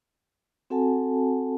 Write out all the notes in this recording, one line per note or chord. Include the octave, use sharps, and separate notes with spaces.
C4 F#4 A4 F#5 G#5 A5